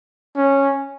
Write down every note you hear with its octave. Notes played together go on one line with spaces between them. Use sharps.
C#4